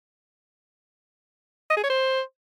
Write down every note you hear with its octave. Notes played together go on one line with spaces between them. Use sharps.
D#5
G#4
C#5
C5